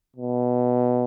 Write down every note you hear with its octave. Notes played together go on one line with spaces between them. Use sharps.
B2